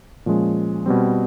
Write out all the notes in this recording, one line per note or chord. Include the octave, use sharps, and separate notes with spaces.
A#2 F3 G#3 C#4
B2 G3 C4